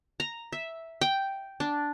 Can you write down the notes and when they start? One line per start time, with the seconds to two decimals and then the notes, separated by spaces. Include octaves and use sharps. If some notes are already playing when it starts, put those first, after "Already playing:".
0.20 A#5
0.53 E5
1.01 G5
1.60 D4